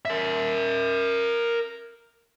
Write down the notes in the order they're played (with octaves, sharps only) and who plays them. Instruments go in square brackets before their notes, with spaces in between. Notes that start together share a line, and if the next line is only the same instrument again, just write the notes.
[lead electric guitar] A#4 E5